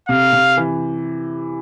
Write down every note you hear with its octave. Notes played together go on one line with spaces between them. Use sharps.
C3 F5
C3
E3